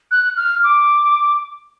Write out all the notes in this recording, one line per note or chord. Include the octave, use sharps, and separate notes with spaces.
F#6
F6
D6